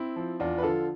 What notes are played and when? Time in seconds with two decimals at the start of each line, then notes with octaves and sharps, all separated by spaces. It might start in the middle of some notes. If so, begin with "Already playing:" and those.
Already playing: C4 E4
0.16 F3
0.40 E2 D4 F4
0.58 B4
0.63 D3 F3 F4 A4